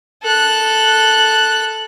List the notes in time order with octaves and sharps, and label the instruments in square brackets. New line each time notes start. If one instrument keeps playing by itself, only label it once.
[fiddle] A4 F#6